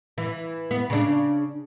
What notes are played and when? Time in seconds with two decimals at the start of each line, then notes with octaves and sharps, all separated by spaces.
0.18 E3
0.71 B3
0.90 C#3 D4